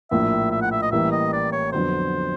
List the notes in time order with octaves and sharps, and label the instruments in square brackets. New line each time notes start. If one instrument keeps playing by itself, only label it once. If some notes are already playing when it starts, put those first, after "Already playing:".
[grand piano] A#1 A2 F3 A#3 [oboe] E5
[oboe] E5
F#5
E5
D#5
[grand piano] A1 A2 E3 G3 A#3 [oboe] E5
[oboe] D#5
D5
C#5
[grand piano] F2 D3 F#3 B3 [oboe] C5